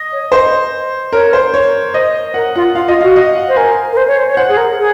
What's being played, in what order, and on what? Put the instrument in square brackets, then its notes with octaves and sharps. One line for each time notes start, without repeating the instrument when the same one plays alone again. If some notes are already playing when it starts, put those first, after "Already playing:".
Already playing: [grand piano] D#5
[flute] C#5
[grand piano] C5 [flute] D#5
[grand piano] A#4 [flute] C#5
[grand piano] C5
C#5
[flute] C5 [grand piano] D#5
[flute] A#4 [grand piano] F#5
[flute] F4 [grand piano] F#5
[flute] F4 [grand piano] F5
[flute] F4 [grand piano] D#5
[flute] F#4 [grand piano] F5
[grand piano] D#5
F#5
[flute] C5
[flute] A#4 [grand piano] G#5
[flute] A#4
C5
C#5
C5
C#5
[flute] C5 [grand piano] F#5
[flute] G#4
A#4
G#4